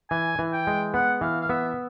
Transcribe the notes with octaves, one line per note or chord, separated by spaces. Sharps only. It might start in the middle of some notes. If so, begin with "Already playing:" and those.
E3 G#5
E3
G5
G#3
B3 F#5
E3 F5
F5
B3 E5